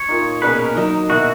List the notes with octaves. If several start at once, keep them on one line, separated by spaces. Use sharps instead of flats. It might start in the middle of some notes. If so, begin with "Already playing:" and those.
Already playing: C#5
A#2 A#3 D#4
B2 A#3 C#4 G#4 B4
A#4
D#3 F#3 A#3 D#4
B2 A#3 E4 F#4